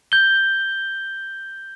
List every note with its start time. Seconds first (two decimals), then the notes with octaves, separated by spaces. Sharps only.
0.12 G6 G7